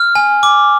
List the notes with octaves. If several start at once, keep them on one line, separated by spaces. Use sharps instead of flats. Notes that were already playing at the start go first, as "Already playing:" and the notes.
Already playing: F6
G#5
D6